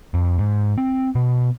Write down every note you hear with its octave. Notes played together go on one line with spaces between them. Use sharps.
F2
G#2
C4
B2